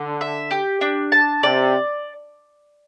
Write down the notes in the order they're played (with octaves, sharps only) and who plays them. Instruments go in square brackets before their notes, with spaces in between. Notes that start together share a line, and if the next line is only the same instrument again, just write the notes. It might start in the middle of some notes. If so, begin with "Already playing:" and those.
Already playing: [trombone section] D3
[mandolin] E5
G4
D4
A5
[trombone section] C3 [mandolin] D5